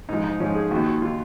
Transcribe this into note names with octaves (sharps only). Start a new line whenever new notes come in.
G#2 F3 D#4
D#4
G#2 F3 C#4
G#4
D#2 D#3 F#4
F#4
D#3 F4